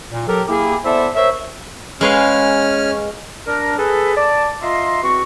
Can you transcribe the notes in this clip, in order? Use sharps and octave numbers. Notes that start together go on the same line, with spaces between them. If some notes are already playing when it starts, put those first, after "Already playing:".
A#2
F#3 G4 A4 A#4
A#3 E4 G4 G#4
B3 E4 A4 C5 D5 E5
A#4 C5 C#5 E5
G#3 C#4 B4 F5 F6
D4 A#4
G#4 A4 B4
D5 A5
F4 D#5 E5 A#5 C6
E2 C4 F#4 C#6